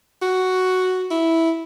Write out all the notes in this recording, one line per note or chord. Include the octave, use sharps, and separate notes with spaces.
F#4
E4